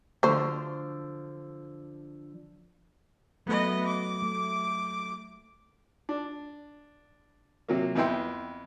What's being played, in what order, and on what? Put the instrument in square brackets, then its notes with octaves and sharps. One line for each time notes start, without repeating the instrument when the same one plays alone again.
[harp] D3 F3 [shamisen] A3 C5
[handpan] F#3 A3 [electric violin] B3 D#5
[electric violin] D6
[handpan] A3
[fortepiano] D4
C3 F#3 A#3
F2 B3 E4 G5 C6